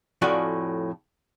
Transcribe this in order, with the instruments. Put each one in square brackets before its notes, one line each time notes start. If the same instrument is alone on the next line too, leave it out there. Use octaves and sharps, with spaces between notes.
[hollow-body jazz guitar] F2 A2 F3 F#4 D5 G#5